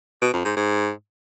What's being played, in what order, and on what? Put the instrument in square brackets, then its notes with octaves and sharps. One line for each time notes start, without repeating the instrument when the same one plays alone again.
[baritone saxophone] B2
F2
G#2
G#2